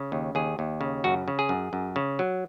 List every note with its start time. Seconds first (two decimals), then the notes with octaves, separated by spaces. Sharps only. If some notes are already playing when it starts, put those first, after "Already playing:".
Already playing: C#3
0.12 D#2
0.35 D#2 G#4
0.59 D#2
0.81 C#3
1.04 F#2 F#4
1.28 C#3
1.39 G#4
1.49 F#2
1.73 F#2
1.96 C#3
2.19 F#3